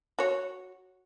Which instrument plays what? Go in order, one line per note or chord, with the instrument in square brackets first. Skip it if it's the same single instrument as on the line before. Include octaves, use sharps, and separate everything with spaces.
[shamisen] F#4 C#5